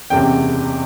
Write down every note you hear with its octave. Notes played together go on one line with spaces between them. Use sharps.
F#1 E2 C3 G5